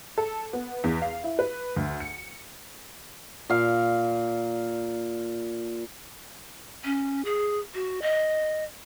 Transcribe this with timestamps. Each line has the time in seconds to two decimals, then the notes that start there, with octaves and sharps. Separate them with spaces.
0.18 A4
0.53 B3
0.84 E2
1.02 F5
1.24 E4
1.39 B4
1.76 D2
2.00 C#7
3.49 A#2 F5
6.85 C#4
7.25 G#4
7.75 F#4
8.02 D#5